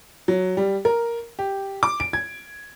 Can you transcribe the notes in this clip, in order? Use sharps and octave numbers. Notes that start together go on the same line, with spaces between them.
F#3
G3
A#4
G4
D6
D7
G#6